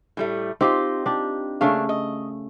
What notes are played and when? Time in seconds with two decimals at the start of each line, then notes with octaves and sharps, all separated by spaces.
0.17 A2 G3 A3
0.61 C4 D#4 F4 G4
1.06 D4 G4
1.61 C#3 A3 A#3 C#4 D4 F5
1.89 D#5